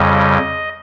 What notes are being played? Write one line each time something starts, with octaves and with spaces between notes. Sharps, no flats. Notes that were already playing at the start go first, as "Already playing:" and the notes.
Already playing: F2 C#3 G3 D#5